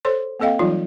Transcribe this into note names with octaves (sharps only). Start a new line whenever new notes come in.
A4 C5 C#5 C6
A#3 C4 A4 D#5 F5 G5
E3 F#3 G3 D#4 F4